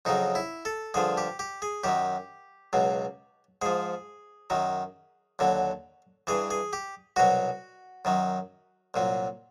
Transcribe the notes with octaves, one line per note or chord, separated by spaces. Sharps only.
F2 C#3 F#3 D#4
E4
A4
G2 D3 F3 G#4
G4
G4
G#4
F#2 D#3 F#3 G4
C#2 B2 F#3
G#2 F3 G#4
F#2 D#3 F#3
D#2 D3 F#3
G2 E3 G#4
G#4
G4
C2 B2 F#3 F#4
F#2 D#3 F#3
C2 A#2 F#3